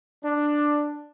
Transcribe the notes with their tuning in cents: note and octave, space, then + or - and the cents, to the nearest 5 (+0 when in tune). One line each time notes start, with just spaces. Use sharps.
D4 +5